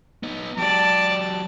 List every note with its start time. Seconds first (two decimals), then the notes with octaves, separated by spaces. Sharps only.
0.23 B3 D#4
0.58 F#3 G4 D5 A5